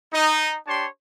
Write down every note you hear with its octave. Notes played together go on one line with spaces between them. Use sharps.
D#4
D4 G4 C#5 A5 C6